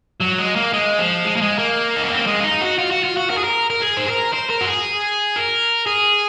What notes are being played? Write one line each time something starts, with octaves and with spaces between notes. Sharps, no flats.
F#3
G#3
A#3
G#3
F3
G#3
A#3
G#3
A#3
D#4
C#4
C4
A#3
G#3
F4
D#4
F#4
F4
F#4
F4
F#4
A#4
G#4
A#4
A#4
G#4
C5
A#4
C5
A#4
F#4
G#4
A#4
G#4